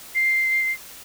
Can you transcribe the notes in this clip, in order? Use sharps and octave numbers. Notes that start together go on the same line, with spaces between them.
C7